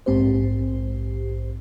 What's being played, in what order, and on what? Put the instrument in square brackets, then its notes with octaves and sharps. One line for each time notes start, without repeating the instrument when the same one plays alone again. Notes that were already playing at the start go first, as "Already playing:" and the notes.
[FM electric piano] A#1 G#2 C4 G4 C5